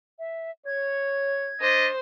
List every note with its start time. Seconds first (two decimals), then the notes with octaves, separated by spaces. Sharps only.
0.19 E5
0.66 C#5 G#6
1.61 D4 C5 D#5